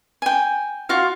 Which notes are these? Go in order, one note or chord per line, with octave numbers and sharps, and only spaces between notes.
G5 G#5
F4 F#4 F5